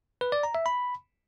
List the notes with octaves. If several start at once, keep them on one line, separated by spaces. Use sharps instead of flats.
B4
D5
A#5
E5
B5